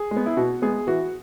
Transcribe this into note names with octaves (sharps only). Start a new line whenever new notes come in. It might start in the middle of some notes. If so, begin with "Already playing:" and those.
Already playing: G#4
G#3
B3
E4
B2 F#4
G#3 B3 G#4
E3 F#4